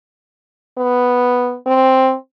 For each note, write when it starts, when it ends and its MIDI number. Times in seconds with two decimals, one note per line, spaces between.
0.77 1.56 59
1.67 2.14 60